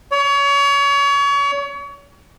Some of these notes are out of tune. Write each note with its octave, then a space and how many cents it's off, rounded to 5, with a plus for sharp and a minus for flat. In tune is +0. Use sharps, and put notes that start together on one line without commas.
C#5 +30